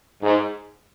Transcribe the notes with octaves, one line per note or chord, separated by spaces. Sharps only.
G#2